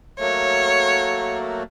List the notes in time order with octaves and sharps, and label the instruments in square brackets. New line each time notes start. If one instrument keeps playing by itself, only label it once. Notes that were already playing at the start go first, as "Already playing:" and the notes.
[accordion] F#3 A3 A#3 [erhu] C#5